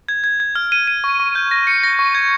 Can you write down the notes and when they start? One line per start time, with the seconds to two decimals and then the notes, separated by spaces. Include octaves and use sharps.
0.09 G#6
0.24 G#6
0.40 G#6
0.55 F6
0.72 D#7
0.87 D#7
1.04 C#6
1.20 C#6
1.35 G6
1.51 A#6
1.67 C#7
1.83 A#6
1.99 C#6
2.15 G#6